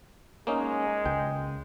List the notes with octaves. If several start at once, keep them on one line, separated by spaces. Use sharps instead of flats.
G#3 A#3 C#4 D#4
C#2 G5